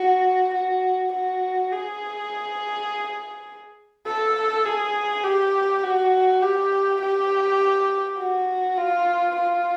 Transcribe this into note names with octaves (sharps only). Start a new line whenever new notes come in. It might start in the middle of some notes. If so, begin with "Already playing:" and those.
Already playing: F#4
F#4
F#4
G#4
A4
G#4
G4
F#4
G4
G4
F#4
F4
F4